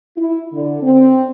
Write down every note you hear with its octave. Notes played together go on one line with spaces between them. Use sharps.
E4
D3
C4